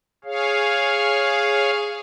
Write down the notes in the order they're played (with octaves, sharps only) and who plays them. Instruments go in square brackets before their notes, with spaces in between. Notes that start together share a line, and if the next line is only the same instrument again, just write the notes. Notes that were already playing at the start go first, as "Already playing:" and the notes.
[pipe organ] G#4 C#5 F5